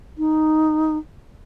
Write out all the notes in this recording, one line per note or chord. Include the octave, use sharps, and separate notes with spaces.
D#4